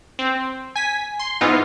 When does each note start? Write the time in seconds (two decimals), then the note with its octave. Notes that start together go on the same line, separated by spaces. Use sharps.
0.19 C4
0.75 G#5 B6
1.19 C6
1.41 G#2 E3 B3 D#4 F4